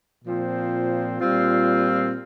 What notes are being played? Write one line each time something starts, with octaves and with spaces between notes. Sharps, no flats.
A#2 F3 C4
A#2 G3 C4 F4